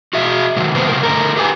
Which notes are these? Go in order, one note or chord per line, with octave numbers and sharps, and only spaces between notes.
F#4 G#4 E5
C3 D#3 F#3
C3 A#3 B3 B4 C5
G2 C#3 A#4
D3 A3 A#4
G4 G#4 B4 G#5